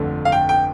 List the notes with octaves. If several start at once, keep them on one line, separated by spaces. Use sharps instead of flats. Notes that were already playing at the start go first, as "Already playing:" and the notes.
Already playing: G1 F2 D3 A3
F5
G5
G5